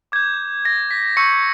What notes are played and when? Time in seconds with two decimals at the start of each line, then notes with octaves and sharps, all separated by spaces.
0.12 D6 G6 G#6
0.65 A#6
0.91 B6
1.17 C#6 E6 G6 C#7